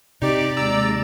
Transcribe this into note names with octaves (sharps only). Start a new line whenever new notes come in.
C3 D#4 G4 D5
D#2 G#3 A#5 E6 A6